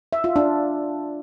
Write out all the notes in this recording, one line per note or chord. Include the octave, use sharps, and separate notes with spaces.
E5
F4
D4